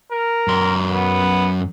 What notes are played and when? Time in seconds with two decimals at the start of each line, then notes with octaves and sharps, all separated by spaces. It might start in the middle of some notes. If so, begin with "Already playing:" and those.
0.12 A#4
0.48 F#2 C6
0.92 B3